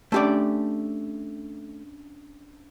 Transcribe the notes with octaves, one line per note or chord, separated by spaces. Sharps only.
A3 C#4 D4 G4 D5